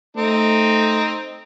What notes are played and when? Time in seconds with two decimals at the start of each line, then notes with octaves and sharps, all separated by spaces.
0.17 A3 C4 D#4